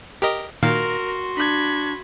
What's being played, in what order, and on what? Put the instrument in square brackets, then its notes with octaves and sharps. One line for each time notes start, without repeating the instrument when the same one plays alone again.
[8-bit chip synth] G4 A#4 D#5
[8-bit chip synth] A#2 D#3 F5 [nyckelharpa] F#4 C6 [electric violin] A#4
[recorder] D4 [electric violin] B5 G#6